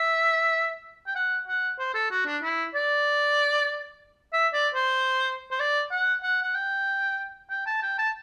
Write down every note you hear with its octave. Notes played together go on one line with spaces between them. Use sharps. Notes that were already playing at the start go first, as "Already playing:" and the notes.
Already playing: E5
G5
F#5
F#5
C5
A4
F#4
D4
E4
D5
E5
D5
C5
C5
D5
F#5
F#5
F#5
G5
G5
A5
G5
A5